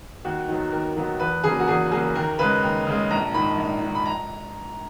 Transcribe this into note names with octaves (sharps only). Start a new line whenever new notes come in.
D#2 F#4
D#3 F#3 B3
D#2 A#4
D#3 F#3 B3
E2 B4
C#3 F#3 A#3 G#4
F#4
E2 G#4
C#3 F#3 A#3 G#4
D#2 A#4
C#3 G#3 B4
D#2
C#3 G#3
A#1 A#5
G#2 D#3 B5
A#1
G#2 D#3
B5
A#5